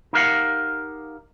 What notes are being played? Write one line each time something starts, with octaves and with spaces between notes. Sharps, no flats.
D#4 E4 G4 A#4 F5 F#5